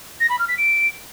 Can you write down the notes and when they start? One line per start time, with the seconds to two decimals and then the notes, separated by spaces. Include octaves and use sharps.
0.20 A#6
0.30 B5
0.39 F6
0.48 B6
0.58 D7